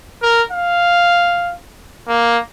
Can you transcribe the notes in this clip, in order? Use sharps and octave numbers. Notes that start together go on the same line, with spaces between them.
A#4
F5
A#3